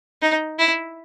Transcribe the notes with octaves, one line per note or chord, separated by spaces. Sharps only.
D#4
E4